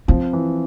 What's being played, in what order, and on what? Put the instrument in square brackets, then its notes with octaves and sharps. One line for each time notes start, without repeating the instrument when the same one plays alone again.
[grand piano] F3 [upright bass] C4
[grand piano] E3